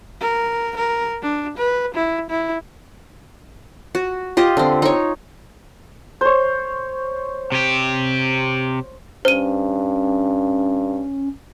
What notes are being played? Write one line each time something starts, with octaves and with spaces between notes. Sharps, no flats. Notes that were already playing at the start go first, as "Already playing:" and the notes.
A#4
A#4
D4
B4
E4
E4
F#4
F4 G4 D#5
D3 C4
D#4 C#5
C5 C#5
C3 G4
G2 C#4 C5 D#7